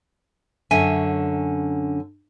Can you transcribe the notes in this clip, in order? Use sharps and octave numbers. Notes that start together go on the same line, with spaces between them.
F#2 D3 C#4 E5 G#5